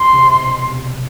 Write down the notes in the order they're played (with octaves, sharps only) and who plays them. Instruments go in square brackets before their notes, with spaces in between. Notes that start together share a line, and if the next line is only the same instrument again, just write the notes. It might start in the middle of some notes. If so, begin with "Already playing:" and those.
Already playing: [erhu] C6
[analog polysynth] C3
B2